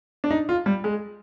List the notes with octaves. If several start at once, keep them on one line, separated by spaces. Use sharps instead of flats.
D4
D#4
F4
G3
G#3